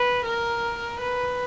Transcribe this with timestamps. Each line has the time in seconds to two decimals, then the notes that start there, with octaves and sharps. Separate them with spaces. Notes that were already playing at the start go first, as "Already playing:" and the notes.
Already playing: B4
0.25 A#4
1.01 B4